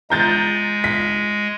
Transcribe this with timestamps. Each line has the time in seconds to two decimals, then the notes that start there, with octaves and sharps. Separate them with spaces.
0.10 G#3 A#5 G6 A6
0.84 B6